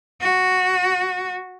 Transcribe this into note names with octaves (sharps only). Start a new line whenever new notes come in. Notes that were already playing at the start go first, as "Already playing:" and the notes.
F#4